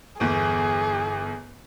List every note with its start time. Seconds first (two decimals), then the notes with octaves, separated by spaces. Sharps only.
0.20 G1 E2 G#4